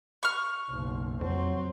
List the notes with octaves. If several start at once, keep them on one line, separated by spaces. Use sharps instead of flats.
C#6 F6
F#1 B1
F2 F#3 C4